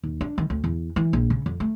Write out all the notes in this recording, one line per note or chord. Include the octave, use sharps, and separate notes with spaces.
D#2
D4
D#3
D2
E2
E3
A#1
C#3
F2
A3